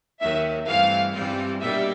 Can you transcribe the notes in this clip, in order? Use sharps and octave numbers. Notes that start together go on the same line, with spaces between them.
D#2 D#3 F#3 E5
G2 E3 A3 C4 F5
G2 E3 G3 C4 F4
B2 G3 A#3 D4 E5